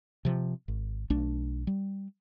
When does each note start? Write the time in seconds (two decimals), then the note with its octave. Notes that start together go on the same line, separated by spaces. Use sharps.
0.25 C3 F3
0.68 G#1
1.10 B1 A3 D4
1.67 G3